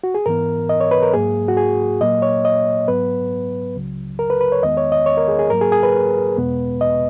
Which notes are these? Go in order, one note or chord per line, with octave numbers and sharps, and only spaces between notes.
F#4
G#4
G#2 E3 B3 A#4
D#5
C#5
B4
A#4
G#2 F#3 A#3 G#4
F#4
G#4
A#2 F#3 A#3 D#5
C#5
D#5
G#2 F#3 B3 B4
C#2 C#3 F#3
A#4
B4
B4
C#5
E2 D#3 G#3 B3 D#5
C#5
D#5
C#5
A#4
G#4
G#4
G#2 F#3 A#3 A#4
G#4
G#4
B4
E2 B2 G#3 B3
D#5